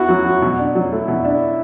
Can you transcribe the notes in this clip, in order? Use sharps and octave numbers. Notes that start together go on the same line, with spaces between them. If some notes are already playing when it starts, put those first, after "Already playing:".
Already playing: B3 E4 F#4
F#3
F#3
B2
D4
F#3
A3 E4
B2
D4